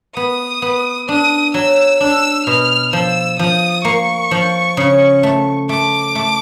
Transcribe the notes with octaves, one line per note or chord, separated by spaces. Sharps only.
B3 D#6
B3
D4 D#6
F#3 E6
D4 E6
B2 F6
F3 E6
F3 D#6
A#3 C#6
F3
C#3
A3
A3 D6
A3